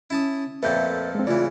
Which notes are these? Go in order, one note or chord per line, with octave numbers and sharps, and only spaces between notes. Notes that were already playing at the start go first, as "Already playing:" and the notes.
C#4 E4 A5 D#6
F2 A#2 A3 B4 E5 G6
G#3 C4
C#3 E3 A3 F4 D5